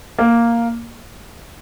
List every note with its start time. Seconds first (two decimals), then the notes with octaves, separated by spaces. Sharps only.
0.19 A#3